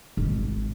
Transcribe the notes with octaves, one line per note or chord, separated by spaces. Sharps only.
G#1